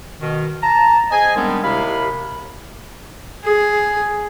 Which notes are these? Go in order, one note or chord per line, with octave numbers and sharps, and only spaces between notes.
B2 D#3
A5 A#5
C4 G#4 D#5 G#5
D#3 G3 G#3 B3 C4 D4
D#2 C3 E4 F5 B5
G#4